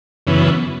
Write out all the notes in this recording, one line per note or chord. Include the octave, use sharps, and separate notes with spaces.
F#2 C#3 E3 B3